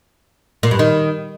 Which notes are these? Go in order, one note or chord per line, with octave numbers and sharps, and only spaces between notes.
A#2
G2
D#3